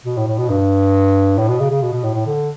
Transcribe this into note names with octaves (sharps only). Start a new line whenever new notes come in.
B2
A2
A2
B2
G2
A2
B2
C#3
C#3
B2
B2
A2
A2
D3